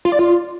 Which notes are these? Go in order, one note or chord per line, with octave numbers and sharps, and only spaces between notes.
F4
D5
F4